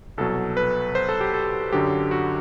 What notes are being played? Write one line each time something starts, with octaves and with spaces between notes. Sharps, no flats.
C2 B2 F#3 A4
B4
C5
A4
G4
A4
F#2 D3 F#3 G4
F#4